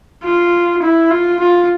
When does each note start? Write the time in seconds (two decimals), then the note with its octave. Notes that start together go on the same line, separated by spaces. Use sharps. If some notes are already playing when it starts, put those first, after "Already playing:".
0.24 F4
0.83 E4
1.11 F4
1.40 F4